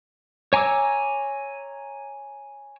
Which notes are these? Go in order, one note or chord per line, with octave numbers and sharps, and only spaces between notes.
C#5 G#5 A#5 D6 E6